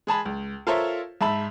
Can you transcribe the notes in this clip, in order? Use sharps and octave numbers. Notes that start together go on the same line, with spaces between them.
G#3 G#4 A5 B5
C#2
F4 A4 A#4 C5 C#5 E5
G#2 E5 A5 B5